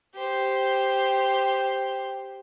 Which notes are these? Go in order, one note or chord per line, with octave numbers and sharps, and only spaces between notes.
G4 C5